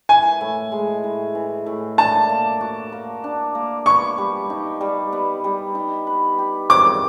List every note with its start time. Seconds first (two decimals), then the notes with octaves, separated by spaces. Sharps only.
0.09 E3 G#5
0.41 A2
0.72 G#3
1.04 A2
1.35 E3
1.66 A2
1.98 D4 A5
2.29 A#3
2.61 F#4
2.92 A#3
3.24 D4
3.55 A#3
3.86 B3 C#6
4.18 G3
4.50 D#4
4.81 G3
5.13 B3
5.44 G3
5.75 D#4
6.07 B4
6.38 G4
6.69 C4 D6